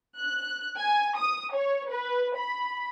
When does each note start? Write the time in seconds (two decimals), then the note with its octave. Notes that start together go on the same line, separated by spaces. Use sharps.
0.18 F#6
0.78 G#5
1.16 D#6
1.53 C#5
1.89 B4
2.37 B5